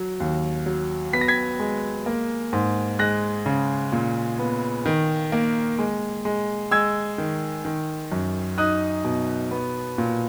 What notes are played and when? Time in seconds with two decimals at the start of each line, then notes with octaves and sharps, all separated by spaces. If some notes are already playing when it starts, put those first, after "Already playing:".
Already playing: F#3
0.20 D#2
0.66 F#3
1.13 B3 B6
1.21 A#6
1.28 G#6 B6
1.60 G#3
2.06 A#3
2.53 G#2
2.99 G#3 F#6 A#6
3.46 C#3
3.92 A#2
4.39 B3
4.86 D#3
5.32 A#3
5.79 G#3
6.25 G#3
6.71 G#3 E6 G#6
7.18 D#3
7.65 D#3
8.12 F#2
8.58 D#4 D#6 F#6
9.04 B2
9.51 B3
9.98 A#2